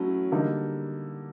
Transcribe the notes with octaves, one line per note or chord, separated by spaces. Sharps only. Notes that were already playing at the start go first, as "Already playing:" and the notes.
Already playing: F#3 A3 C#4 E4
D3 G3 A#3 D#4